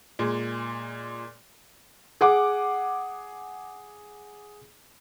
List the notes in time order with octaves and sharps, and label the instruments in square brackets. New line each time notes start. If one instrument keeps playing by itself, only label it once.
[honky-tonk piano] A#2 G#3
[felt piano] G#4 F#5 D6